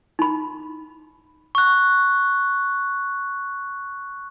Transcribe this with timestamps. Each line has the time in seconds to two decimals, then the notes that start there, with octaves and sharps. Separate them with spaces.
0.19 D#4 B5
1.55 C#6 F#6